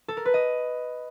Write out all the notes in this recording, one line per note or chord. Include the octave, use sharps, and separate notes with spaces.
A4
A#4
B4
D#5